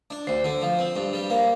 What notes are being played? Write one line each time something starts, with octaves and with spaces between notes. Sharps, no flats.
D4
D2 C5
D3
F3
C4
G2
G3
A#3